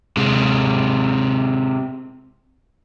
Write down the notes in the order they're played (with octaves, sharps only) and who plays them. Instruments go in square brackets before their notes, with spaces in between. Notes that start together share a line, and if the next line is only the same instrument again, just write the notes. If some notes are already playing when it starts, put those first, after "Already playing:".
[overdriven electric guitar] C3 G#3